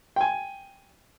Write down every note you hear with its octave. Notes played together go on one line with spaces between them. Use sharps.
G5 G#5